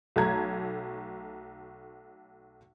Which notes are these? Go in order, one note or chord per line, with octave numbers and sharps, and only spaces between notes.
B1 A3 A5 A#5 G#6